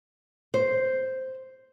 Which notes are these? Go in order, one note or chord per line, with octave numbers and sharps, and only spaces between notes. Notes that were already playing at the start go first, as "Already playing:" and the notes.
C5